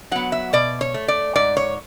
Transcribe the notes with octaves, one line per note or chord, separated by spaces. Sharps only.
F#3 B3 F#5
E5
B2 D5
C#5
A3
D5
G#2 D5
C#5